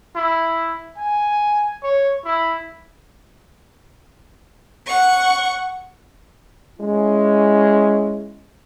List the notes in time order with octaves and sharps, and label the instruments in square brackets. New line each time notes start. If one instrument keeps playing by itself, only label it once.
[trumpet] E4
G#5
C#5
E4
[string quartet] F#5 C#6
[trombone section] G#3 C#4 E4